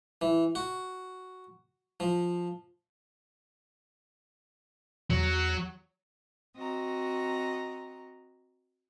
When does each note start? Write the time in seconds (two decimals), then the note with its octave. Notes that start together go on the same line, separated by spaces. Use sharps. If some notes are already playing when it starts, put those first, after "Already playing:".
0.21 E3
0.55 F#4
2.00 F3
5.10 E2 F#3
6.56 C4 F#4 D#5 A#5